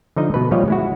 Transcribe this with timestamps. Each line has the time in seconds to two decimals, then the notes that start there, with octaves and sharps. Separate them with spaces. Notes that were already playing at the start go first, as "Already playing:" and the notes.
0.16 D3 F3 D#4 D#5
0.34 B2 B4
0.51 A#2 F3 G3 C#5 D#5 F5
0.68 G#3 E4 F#4